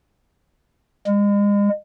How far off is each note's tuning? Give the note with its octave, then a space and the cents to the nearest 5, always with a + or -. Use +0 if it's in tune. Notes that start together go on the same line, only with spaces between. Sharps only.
G#3 -35